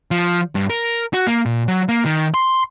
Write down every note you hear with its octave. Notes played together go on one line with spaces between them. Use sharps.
F3
G2
A#4
F#4
A#3
A#2
F#3
A#3
D#3
C6